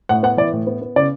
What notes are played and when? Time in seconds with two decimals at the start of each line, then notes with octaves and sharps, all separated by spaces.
0.09 A2 F#5
0.23 B3 F#5
0.37 E3 D5
0.53 A2
0.67 B3
0.82 B3
0.96 C#3 D5